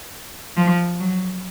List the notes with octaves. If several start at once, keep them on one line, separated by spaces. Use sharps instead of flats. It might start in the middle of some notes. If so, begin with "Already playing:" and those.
F3
F#3